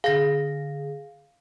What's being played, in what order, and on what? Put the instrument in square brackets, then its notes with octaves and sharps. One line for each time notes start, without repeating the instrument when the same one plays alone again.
[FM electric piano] D3 G#4 [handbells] F5 A#6